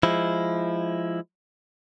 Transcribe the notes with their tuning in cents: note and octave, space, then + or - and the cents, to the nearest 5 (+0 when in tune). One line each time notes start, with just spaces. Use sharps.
F3 -5 G#3 +0 E4 +0